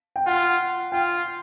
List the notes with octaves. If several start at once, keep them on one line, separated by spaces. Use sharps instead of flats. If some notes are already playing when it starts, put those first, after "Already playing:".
G5
F4 F#5
F4 G5